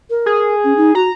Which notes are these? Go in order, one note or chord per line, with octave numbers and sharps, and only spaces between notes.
A#4
G#4
C#4
D#4
F#4 A#5